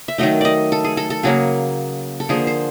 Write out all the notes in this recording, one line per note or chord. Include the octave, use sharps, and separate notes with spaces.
E5
D#3 F#3 A3 D#5
D5 D#5
A4
G#4
A4
A4
C#3 F#3 A#3 G#4
A4
D3 F3 A#3 G#4
C5